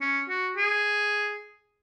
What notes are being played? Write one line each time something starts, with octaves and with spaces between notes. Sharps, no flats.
C#4
F#4
G#4